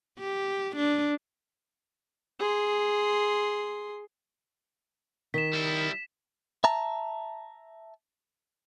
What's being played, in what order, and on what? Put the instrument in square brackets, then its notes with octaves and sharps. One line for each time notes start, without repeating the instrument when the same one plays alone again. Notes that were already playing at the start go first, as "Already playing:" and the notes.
[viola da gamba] G4
D4
[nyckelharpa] G#4 C6
[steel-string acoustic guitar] D#3 [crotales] B6 E7
[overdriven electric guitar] G3 E4
[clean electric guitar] E5 A5 A#5